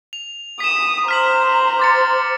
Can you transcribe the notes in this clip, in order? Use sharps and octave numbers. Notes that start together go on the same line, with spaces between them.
F7
D#6 B6 E7
C5 A#5 F6 B6 F#7
D6 A6 C#7